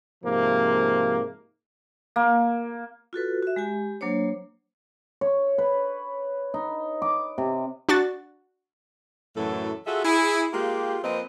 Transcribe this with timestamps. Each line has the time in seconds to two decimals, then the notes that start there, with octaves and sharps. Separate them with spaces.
0.24 G#2 C3 F3 A#3
2.16 A#3
3.13 F4 F#4 A4 B4
3.43 F#4 E5
3.56 G#3 G4 G#5
4.01 F#3 A#3 D4 C5 C#5
5.21 C#5
5.58 B4
6.54 D#4
7.02 D6
7.38 C3
7.89 D4 F#4 A6
9.36 F#2 A2 E3 F#3 A3 A4
9.86 F4 F#4 G#4 A4 E5
10.04 E4 G#4
10.53 G#3 A#3 F4 G4
11.04 F3 A#3 C4 B4 D#5